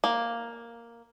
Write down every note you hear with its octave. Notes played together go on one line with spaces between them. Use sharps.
A#3